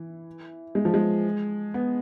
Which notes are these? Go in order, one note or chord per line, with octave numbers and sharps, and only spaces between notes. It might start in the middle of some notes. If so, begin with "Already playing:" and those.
Already playing: E3
G#3
F3
G#3
B3